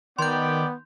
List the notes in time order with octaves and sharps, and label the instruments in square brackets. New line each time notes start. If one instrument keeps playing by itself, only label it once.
[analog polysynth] D#3 [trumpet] B3 [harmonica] D5 G5 D6 [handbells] C6 G6